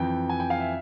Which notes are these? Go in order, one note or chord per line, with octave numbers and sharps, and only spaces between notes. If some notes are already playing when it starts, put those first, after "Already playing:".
Already playing: F2 E3 G5
G#5
G5
F5
E5